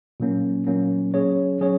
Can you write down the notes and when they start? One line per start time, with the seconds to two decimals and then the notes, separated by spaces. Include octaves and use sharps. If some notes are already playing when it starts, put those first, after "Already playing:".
0.20 A#2 F#3 A#3 C#4
0.67 A#2 F#3 A#3 C#4
1.14 F#3 C#4 G#4 C#5
1.61 F#3 C#4 G#4 C#5